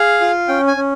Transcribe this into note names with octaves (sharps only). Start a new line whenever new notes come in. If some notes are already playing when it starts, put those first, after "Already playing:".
Already playing: G#4 F5
F4
C#4 G5
G#5
C#4